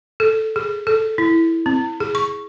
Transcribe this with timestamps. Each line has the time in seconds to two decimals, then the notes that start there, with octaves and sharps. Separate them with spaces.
0.20 A4
0.56 G#4
0.87 A4
1.18 E4
1.66 C4
2.00 G#4
2.15 C#6